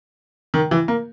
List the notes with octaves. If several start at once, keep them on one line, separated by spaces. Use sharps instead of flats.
D#3
E3
A#3